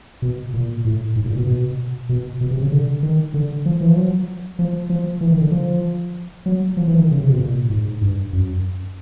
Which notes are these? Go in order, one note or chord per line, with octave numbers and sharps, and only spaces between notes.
B2
A#2
A2
G#2
A#2
B2
B2
B2
B2
C3
C#3
D3
D#3
D3
F3
E3
F3
F#3
F3
F3
E3
D#3
D3
F3
F#3
F3
E3
D#3
C#3
C3
B2
A#2
G#2
G2
F#2